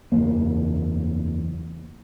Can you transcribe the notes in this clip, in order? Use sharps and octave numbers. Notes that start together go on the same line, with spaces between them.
F#1 E2 A#3